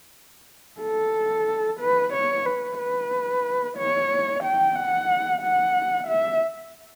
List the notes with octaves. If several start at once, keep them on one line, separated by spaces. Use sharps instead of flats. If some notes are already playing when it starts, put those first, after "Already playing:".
A4
B4
C#5
B4
B4
C#5
G5
F#5
F#5
E5